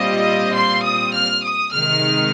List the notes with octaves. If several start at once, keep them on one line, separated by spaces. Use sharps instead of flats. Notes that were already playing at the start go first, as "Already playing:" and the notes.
Already playing: A#2 G3 C4 F4 D#5
C6
D#6
F6
D#6
C3 D#3 G#3 D#4 F6